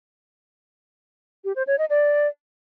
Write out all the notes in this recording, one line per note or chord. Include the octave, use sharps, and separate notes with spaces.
G4
C5
C#5
D#5
D5